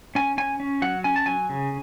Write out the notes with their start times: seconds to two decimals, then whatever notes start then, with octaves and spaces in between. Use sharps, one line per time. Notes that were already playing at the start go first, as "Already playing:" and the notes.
0.15 C#4 G#5
0.38 C#4 G#5
0.60 C#4
0.82 F#3 F#5
1.04 C#4 G#5
1.16 A5
1.26 F#3 G#5
1.49 C#3